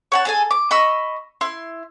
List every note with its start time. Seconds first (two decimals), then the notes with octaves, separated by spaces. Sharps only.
0.12 C#5 F#5 A5
0.25 G#4 A4 G#5
0.51 D6
0.71 D#5 B5 C#6 E6
1.41 E4 C6